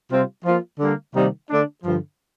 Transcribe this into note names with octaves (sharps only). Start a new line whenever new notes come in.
C3 G3 C4 F4
F3 A#3 F4
D3 G3 A#3
C3 D#3 G3 A#3 D#4
D3 A3 D4
G2 D3 F3